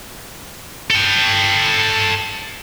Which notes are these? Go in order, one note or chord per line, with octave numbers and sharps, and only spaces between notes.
A4 G5